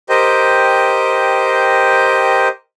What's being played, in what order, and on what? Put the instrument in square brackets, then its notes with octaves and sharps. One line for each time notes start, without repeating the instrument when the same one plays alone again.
[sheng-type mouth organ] G4 A#4 C5 D#5 G5